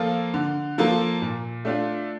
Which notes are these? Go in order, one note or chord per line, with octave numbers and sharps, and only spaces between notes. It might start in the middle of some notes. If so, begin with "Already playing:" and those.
Already playing: F3 A#3 F4 A4
D3
F3 A#3 F4 A4
A#2
A3 D4 F4